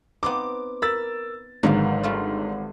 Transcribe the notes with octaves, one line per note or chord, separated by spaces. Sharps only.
B3 C4 D#4 D6
A#4 B5 E6 A6
G#1 G#2 D3 D#3 F#3 A#3 B3
G3 A3 F4